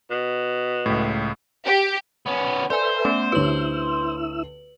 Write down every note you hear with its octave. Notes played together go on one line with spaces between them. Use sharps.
B2
C#2 A2
G4
B3 C#4
A4 B4 C5 D5 E5 G#5
A3 B3 C#4
D2 E4 G4 B4 C#5 E6 F#7